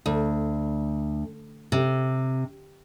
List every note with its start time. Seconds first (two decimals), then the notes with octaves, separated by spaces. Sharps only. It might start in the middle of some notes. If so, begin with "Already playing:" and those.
0.06 D2
1.72 C3